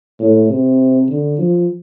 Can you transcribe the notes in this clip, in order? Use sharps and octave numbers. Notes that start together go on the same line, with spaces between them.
A2
C3
D3
F3